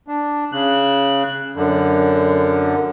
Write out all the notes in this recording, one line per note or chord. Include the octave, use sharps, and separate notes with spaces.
D4
C#3 F#6
F#2 D3